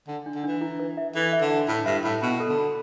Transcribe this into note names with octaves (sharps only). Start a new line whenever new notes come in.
D3 D4
D4
D3
E3 D4
E4
B4
E5
E3 A4
E5
D3
D4
A2 B5
G2 E5
A2 B5
B2 B5
A4
D3
B5